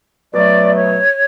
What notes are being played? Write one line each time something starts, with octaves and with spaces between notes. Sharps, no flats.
B2 F#3 A3 D5
C#5